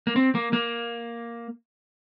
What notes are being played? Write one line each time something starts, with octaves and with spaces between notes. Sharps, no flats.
A#3
C4
A#3
A#3